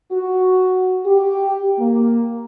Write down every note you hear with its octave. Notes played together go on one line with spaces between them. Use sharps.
F#4
G4
A#3